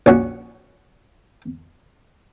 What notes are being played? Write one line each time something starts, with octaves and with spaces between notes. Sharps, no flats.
A#1 C#4 F#4